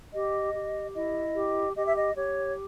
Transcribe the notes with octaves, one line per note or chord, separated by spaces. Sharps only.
G4 D#5
G4
E4 D#5
G4
G4 D#5
E5
D#5
G4 C#5